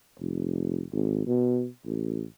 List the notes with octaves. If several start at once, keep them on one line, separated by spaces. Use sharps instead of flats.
F1
G#1
B2
A1